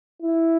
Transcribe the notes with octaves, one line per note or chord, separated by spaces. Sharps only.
E4